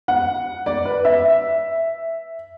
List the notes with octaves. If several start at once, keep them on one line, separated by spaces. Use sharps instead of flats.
F#5
D5
B4
E5